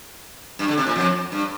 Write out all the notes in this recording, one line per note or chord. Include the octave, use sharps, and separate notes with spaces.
G2
D3
C3
A#2
F2
G2